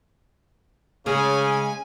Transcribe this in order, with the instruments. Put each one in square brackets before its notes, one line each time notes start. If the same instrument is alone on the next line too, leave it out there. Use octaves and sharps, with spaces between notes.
[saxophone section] C#3 [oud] G#3 C#4 [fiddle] G#5